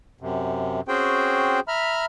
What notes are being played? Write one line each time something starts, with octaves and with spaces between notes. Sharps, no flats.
F#2 C3
C4 C#4 F#4 G#4 C5 G5
E5 A#5 B5 F6